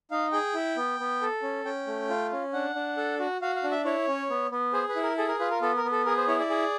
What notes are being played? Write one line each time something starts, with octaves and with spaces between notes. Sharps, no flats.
D#4 F5
G#4 G5
E4
B3
B3
A4
C#4
C#4 G5
A3
F4
C#4
D4 F#5
D4
A4
F#4
F#4 F5
F5
D4
E5
E4 C#5
C#4
B3
B3
G#4 C5
B4
E4
A#4
G#4 A4
A#4
F4 B4
A#4
B3 A4
A#4
B3
A4
G#4 A#4
C5
E4 C#5
D5
G#4